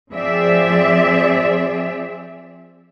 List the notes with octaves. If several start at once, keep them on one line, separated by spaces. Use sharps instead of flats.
F3 C4 G#4 D5 E5